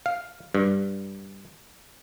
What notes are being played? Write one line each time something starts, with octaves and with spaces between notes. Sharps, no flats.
F5
G2